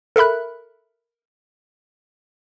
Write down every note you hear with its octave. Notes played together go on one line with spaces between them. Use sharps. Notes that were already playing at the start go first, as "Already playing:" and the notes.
A4 A#4 E5 B5 F#6